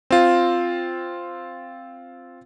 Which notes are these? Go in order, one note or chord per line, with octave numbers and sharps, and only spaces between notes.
C4 F4